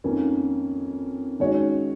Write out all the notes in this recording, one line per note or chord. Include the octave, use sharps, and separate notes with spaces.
F2 D#3 A#3 C#4
D#3 G#3 C#4 F#4 C#5